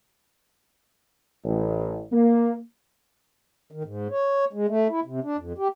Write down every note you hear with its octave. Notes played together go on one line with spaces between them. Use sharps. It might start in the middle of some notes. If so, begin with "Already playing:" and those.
A1
A#3
D#3
G#2
C#5
G#3
A3
E4
C3
D4
F2
G4